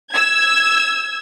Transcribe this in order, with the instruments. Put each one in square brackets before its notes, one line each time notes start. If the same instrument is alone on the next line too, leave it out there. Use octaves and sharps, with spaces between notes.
[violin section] E6 G#6